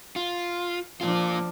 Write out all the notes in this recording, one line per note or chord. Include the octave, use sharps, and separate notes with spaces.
F4
F3 A#3 D4 F4